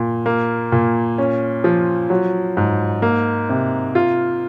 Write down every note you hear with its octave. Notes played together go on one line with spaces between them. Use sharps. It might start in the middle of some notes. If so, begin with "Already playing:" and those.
Already playing: A#2
A#3
A#2
C#4
F3
F#3
G#2
A#3
C3
F4